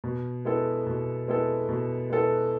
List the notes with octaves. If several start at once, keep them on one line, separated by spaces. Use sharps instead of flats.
B2
G#3 B3 E4 A4
B2
G#3 B3 E4 A4
B2
G#3 B3 E4 A4